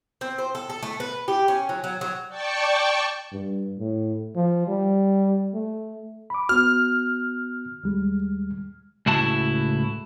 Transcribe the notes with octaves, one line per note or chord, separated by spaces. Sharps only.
C4
C5
A4
A4
A3
B4
G4
C#4
F#3
F#3
F#3
D5 G5 A5 C#6
G2
A2
F3
G3
A3
B5 D6
B3 F#4 F6
D#2 G3 G#3
C#2 A2 E4 F#4 A5